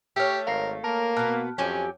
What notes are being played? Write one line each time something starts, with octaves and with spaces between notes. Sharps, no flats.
A3 G4 C#5 E6 F6
G#1 A#4 F5 C7
A#3 A#4 A5
B2 B3 A5 F6 F#6
F2 F#3 C#4 G4 G#5